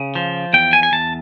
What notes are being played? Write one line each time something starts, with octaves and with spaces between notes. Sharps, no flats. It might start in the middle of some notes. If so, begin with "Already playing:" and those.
Already playing: C#3
F3
E2 G5
G#5
G#5
E2 A5